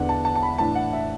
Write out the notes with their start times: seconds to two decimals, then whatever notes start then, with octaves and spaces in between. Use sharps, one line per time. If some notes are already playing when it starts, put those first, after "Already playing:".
Already playing: E2 D3 B3 D4 F#5
0.09 A5
0.25 A5
0.36 A5
0.43 B5
0.58 A2 E3 D4 A5
0.75 F#5
0.93 E5